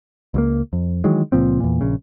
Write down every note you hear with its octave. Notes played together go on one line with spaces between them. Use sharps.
C#2 F#3 A#3
F2
D#3 E3 F#3 G#3
C#2 A#2 F3 C4
E2 A#2
A#1 C#3